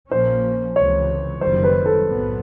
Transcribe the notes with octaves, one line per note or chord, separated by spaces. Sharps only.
A#1 A#2 F3 A#3 C#4 C5
C#2 C3 E3 C#5
F#1 F#2 D#3 G3 C5
B4
A4
B1 A2 F#3 B3